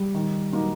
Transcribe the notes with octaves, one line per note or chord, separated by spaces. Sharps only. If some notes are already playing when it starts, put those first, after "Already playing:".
Already playing: G3
D#3
F#3 A#3 D#4